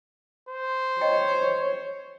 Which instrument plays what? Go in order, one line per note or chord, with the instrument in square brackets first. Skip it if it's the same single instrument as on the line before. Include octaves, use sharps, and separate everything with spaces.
[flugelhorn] C5
[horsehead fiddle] C#5 [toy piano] D#5 G5 A#5